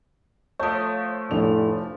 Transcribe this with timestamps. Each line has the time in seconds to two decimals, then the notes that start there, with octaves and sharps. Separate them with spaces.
0.59 F3 A3 C#5
1.31 F1 A2 D4 F7